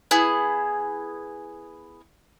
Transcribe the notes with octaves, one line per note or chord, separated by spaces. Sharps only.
B3 E4 G#4